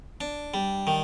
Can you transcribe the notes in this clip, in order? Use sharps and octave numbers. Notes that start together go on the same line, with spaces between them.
D4
G3
D#3